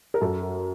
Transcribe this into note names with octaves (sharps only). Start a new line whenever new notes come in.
A#4
F#2 A4